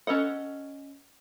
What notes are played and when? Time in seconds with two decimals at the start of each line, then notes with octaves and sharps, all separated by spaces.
0.07 C#4 A4 D#5 F#5